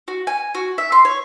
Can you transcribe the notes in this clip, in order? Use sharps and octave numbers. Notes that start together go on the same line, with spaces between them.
F#4
G#5
F#4
E5
C6
C#5